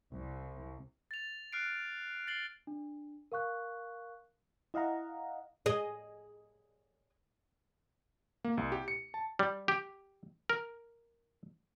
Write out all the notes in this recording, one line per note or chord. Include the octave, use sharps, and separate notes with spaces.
C2
A6 F7
F6 F#6 C7 D7
A6 C7 F#7 G7
D4
A#4 F5 C#6 F#6
E4 D#5 F5 F#5 A#5
G#4 D#5
A#3
C2
G4
C#7
A5
G3
G4
A#4